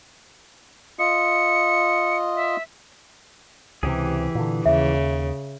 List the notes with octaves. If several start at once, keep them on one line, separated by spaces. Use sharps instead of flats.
F4 D#5 C#7
E5
C#2 C3 E3 G4 G#4
A#2 D3
D#2 C#3 E5